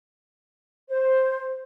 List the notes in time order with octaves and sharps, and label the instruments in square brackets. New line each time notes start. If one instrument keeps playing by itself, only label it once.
[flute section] C5